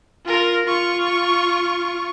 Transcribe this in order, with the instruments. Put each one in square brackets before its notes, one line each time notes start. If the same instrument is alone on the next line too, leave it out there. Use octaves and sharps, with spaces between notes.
[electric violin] F4 A#4
F4 C#6